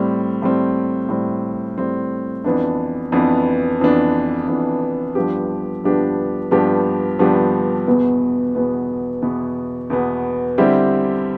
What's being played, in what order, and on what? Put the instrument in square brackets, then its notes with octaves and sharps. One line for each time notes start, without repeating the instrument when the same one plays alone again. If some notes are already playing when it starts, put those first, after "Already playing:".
Already playing: [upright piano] A2 G3 C4
A2 G3 C4
A2 G3 C4
A2 G3 C4
F2 E3 B3 D4
F2 E3 B3 D4
F2 E3 B3 D4
F2 E3 B3 D4
G2 F3 B3 D4 G4
G2 F3 B3 D4 G4
G2 F3 B3 D4 G4
G2 F3 B3 D4 G4
E2 B2 B3
E2 B2 B3
E2 B2 B3
E2 B2 B3
D3 G3 C4 E4 G4